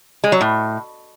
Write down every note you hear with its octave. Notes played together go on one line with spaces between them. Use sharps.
G#3
F#3
A2